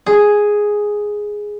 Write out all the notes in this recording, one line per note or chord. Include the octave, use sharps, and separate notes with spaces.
G#4